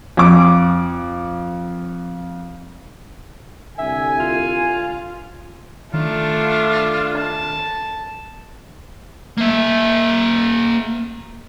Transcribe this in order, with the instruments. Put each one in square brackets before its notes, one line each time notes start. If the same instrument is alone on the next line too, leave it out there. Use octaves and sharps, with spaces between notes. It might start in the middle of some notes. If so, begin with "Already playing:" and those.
[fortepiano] F2 D6
[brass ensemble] C2 D3 G#5 [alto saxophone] E5
[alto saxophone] F4
[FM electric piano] D#3 [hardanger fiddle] A3 D4 [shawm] F4
[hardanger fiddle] A5
[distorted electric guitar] A#3 E5